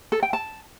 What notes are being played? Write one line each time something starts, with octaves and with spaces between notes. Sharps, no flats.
A4
G5
A5